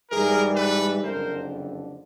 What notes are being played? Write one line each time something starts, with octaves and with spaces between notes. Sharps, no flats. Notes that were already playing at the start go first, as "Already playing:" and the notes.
G#2 E3 G3 G#4 A#4
A4 B4
F#1 F2 D3 A#4 C5